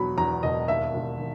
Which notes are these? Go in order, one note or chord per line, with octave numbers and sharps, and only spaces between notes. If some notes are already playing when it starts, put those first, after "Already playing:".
Already playing: E1 E2 B2 F#3 B5
E2 A#5
E1 D#5
D#2 E5
E1
D#3